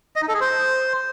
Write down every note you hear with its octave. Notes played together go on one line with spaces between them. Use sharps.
D#5
D#4
A4
G#4
C5